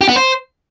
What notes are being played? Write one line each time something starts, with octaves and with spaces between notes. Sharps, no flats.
G4
B3
C5